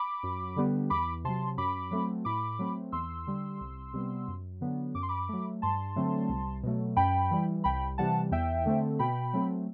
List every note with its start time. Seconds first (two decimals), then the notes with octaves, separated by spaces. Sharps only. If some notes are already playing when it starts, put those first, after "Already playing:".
Already playing: B5 D6
0.23 F#2
0.56 D3 G3 B3
0.90 E2 B5 D6
1.24 C3 F#3 A5 C6
1.58 F#2 B5 D6
1.91 F#3 A3 C4
2.25 A2 B5 D6
2.59 F#3 A3 C4
2.92 E2 C6 E6
3.27 D3 G3
3.61 C2
3.94 C3 G3 B3
4.28 F#2
4.61 D3 F#3 B3
4.95 F#2 D6
5.03 C6
5.09 B5 D6
5.29 F#3 A3
5.62 G2 A5 C6
5.96 D3 F#3 A3 C4
6.29 C2
6.63 B2 F#3 A3
6.97 F#2 G5 B5
7.31 E3 G3
7.64 C2 G5 B5
7.98 C3 E3 G3 F#5 A5
8.31 E2 E5 G5
8.66 D3 A3 C4
8.99 B2 G5 B5
9.33 F#3 A3 C4